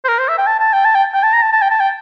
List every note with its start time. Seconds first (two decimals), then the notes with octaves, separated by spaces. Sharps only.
0.05 C5
0.09 A#4
0.19 C5
0.29 E5
0.38 G5
0.47 A5
0.59 A5
0.73 G5
0.85 A5
0.95 G5
1.14 G5
1.23 A5
1.33 A#5
1.42 A5
1.52 A5
1.62 G5
1.70 A5
1.80 G5